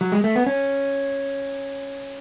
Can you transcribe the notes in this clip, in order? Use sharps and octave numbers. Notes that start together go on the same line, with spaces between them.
F#3
G#3
A3
B3
C#4